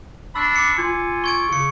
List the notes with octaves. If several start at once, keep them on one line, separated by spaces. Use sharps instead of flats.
D4 A5 B5 C#6 E6
D6 C#7
F4 G#5
C#6 G#6 D7
C#3 C#6 C#7